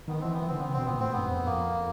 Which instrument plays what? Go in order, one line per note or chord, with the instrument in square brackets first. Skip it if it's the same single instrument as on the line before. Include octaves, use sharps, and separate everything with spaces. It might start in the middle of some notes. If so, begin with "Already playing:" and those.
[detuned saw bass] D#3 [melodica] B3
[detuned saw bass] E3 [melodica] C4
[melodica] B3
[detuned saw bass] E3
[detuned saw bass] D3 [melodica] C4
[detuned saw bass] D3 [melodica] B3
[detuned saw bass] C#3
[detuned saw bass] B2 [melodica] C4
[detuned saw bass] A#2 [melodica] B3
[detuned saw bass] A2 [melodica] C4
[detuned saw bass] G2 [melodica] B3
[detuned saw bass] F#2
E2
F2
[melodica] A#3